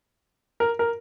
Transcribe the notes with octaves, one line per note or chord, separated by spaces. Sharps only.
A#4
A#4